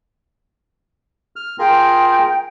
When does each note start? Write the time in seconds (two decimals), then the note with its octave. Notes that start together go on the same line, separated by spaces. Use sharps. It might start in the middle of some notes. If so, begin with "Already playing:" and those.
1.36 F6
1.59 F4 G#4 A#4 G5